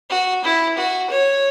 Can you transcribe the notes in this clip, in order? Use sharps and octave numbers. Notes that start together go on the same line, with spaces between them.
F#4
E4
F#4
C#5